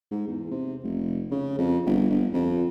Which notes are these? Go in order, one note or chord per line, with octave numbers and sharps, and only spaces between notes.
G#2
E2
C3
F1
C#3
F2
G1
G1
F2